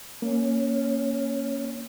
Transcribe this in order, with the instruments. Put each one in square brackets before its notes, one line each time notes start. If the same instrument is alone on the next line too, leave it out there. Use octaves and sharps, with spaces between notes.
[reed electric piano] A#3 [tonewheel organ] C#4